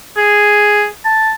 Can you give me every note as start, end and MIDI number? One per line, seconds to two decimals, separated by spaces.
0.17 0.86 68
1.05 1.32 81